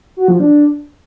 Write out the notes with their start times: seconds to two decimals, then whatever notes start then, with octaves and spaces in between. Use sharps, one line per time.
0.17 F#4
0.28 F3
0.40 D4